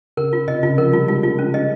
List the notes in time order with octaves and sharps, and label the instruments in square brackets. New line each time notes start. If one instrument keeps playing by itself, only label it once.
[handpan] C#3 [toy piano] A#4
[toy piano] F4
[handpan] C3 [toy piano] D#5
[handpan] C#3 [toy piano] F4
[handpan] F3 [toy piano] A#4
[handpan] G3 [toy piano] F4
[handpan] G#3 [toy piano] F4
[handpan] C#3 [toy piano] F4
[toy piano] C#4
D#5